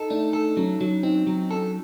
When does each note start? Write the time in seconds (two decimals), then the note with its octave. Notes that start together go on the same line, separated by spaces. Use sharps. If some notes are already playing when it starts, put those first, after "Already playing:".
Already playing: D#4 A4
0.10 A3 D4
0.33 A4
0.57 F#3 C#4
0.81 F#3
1.03 C4 D#4
1.27 F#3
1.51 A4